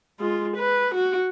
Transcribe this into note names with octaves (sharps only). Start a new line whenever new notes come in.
G#3 F4
B4
F#4